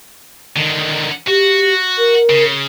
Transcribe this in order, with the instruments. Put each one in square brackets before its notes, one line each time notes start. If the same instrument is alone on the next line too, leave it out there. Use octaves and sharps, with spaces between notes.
[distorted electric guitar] D3 D#3
[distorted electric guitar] F#4 [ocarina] G4
[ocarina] A#4
[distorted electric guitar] C#3